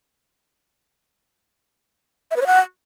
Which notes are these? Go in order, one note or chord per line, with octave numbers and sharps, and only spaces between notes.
E5
B4
C#5
F#5